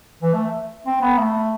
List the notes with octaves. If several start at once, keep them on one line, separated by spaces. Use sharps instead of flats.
E3
A3
C4
B3
A3